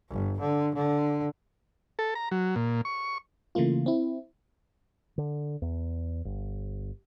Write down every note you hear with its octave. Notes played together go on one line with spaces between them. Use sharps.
G1
D3
D3
A4
A#5
F#3
A#2
C#6
C#3 E3 A3 A#3 F4
C4 E4
D3
E2
G1